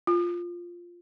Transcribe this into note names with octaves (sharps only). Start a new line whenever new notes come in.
F4